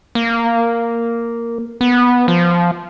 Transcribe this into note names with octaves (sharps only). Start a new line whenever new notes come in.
A#3
B3
F3